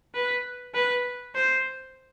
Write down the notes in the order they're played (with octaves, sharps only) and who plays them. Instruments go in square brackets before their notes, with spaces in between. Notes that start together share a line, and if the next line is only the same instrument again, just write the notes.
[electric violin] B4
B4
C5